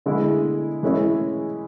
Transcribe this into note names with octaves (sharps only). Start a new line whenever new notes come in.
D3 G#3 B3 E4
E3 G#3 C#4 E4 G#4